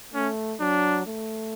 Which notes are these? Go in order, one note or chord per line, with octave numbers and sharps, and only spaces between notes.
A3 C#4
F#3 D4
A3